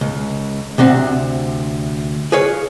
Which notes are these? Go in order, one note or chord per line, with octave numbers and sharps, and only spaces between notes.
C#2
D2 C3 C4 F#5
G#4 B4 C#5 F5